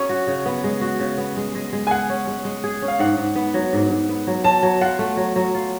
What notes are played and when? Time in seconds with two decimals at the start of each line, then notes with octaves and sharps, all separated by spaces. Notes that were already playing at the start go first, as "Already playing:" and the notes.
Already playing: F#3 C#4 G#4 C#5
0.09 F#4
0.27 C#3
0.46 B3
0.64 G#3
0.81 F#4
1.00 C#3
1.18 B3
1.37 G#3
1.55 G#3
1.73 G#3
1.87 G#5
1.91 G#4 F#5
2.09 C#4
2.27 G#3
2.45 G#3
2.64 G#4
2.82 C#4
2.88 F5
2.99 G#2 F#5
3.17 G#2
3.36 B3
3.54 F#3
3.73 G#2
3.90 G#2
4.09 B3
4.27 F#3
4.44 F#3 A5
4.63 F#3
4.81 F4 F#5
4.99 A3
5.17 F#3
5.36 F#3
5.55 F4